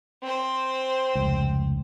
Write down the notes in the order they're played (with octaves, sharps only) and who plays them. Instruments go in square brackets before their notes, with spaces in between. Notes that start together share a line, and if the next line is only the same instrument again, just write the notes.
[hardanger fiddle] C4 C5
[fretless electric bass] F1 C#2